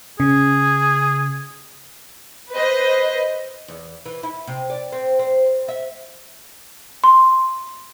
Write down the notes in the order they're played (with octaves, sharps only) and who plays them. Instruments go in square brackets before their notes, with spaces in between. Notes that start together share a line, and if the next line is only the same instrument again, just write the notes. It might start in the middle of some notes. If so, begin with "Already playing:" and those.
[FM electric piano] C#3 [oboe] G#4
[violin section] B4 C5 D#5
[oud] E2
E3
E4
C3
D5
C4
C4
E5
[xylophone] C6